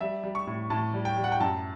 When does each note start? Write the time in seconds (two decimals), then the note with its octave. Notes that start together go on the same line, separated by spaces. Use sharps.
0.01 G3 E5
0.24 G3
0.35 C#6
0.47 A2
0.70 A2 A5
0.94 G3
1.05 G5
1.16 G3
1.24 F#5
1.32 G5
1.40 F#2 A5